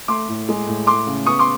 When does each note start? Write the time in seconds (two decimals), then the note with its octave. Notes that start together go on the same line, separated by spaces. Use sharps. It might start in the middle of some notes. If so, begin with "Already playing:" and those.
0.08 A3 C6 D6
0.28 A2
0.49 G#3
0.67 A2
0.87 A3 C6 D6
1.07 C#3
1.26 B3 C#6 D#6
1.39 C6 D6